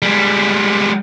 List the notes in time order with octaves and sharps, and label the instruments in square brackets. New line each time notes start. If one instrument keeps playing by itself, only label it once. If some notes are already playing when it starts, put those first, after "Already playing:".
[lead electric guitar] G3 G#3